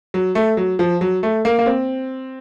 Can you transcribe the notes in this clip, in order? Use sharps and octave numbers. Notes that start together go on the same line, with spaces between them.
F#3
A3
F#3
F3
F#3
A3
A#3
A#3
C4